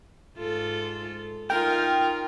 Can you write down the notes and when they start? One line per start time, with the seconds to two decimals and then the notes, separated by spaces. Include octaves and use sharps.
0.37 G#2 F4 A4
1.50 D#4 F4 A#4 G5